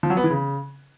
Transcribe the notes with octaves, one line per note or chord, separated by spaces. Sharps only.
F3
F#3
B3
E3
C#3